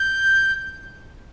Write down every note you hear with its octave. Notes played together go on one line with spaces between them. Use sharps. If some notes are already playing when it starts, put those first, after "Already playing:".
Already playing: G6